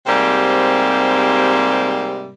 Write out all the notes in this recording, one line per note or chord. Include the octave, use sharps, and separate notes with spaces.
G#2 C3 G3 A#3 C4